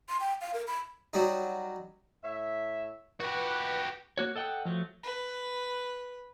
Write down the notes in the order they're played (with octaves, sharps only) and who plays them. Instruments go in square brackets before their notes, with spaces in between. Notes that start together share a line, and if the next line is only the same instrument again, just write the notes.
[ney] C6
G5
F5
A#4
B5
[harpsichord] F#3 G3 D#4
[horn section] A2 C#5 E5
[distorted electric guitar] F#4 G4 [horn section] B4
[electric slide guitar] A#3 F#4 C#5
A4 D#5 F#5 G5
F3 F#3 A3
[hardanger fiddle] B4